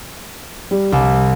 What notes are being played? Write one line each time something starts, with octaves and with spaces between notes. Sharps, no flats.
G3
C2